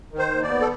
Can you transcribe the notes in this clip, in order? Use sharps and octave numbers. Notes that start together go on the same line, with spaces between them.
D#3
C5
D#2
D5
B3
A4